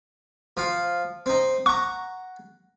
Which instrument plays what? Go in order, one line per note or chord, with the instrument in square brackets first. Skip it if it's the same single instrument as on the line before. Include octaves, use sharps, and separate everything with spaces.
[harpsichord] F3 F5
C4 D#4
[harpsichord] F#5 A#5 [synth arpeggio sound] C#6